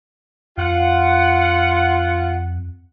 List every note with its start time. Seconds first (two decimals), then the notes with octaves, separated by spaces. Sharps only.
0.57 F2 F4 F#5